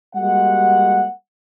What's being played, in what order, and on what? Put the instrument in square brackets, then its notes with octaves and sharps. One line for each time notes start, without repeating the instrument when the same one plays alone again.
[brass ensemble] G3 G#3 A#3 F#4 F#5